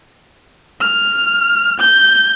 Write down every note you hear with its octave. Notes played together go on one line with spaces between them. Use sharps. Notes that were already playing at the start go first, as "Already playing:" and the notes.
F6
G6